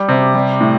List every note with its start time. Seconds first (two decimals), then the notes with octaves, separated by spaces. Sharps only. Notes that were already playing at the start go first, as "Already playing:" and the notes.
Already playing: G3
0.09 C3
0.34 G3
0.61 A2